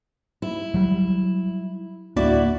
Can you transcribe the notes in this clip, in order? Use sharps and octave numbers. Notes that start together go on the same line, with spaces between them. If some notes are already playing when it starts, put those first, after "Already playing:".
E4
F#3 G3
D1 A#3 D4 E4 F#4 D5